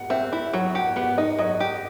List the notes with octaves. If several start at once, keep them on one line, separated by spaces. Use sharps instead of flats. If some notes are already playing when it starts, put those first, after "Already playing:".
Already playing: F#5
C4 E5
E4
F#3 F#5
G4 F#5
B3 F#5
D#4 D#5
F#3 D#5
G4